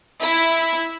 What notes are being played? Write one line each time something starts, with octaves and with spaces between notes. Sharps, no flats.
E4